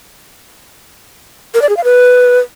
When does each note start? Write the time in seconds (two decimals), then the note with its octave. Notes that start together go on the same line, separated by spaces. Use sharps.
1.54 A#4
1.62 D5
1.69 G#4
1.77 F5
1.84 B4